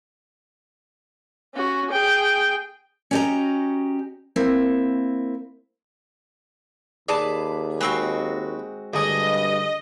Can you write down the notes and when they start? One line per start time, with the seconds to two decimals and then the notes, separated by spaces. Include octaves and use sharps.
1.55 C#4 F#4
1.91 G#4 G5
3.11 C#4 F#4 G4 B4 D#5 A#5
4.36 A#3 C4 E4
7.09 D#2 G#4 B4 D5 A5
7.81 G#3 C4 F#4 B4 C#6
8.94 D2 G2 G#4 D#5